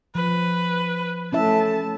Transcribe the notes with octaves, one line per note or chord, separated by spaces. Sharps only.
F3 B4
A3 C#4 E4 E5 A5